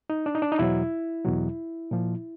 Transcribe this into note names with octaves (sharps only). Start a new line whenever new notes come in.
D#4
D4
D#4
D4
D#4
E2 B2 F#3 E4
E2 B2 F#3
A#2 F3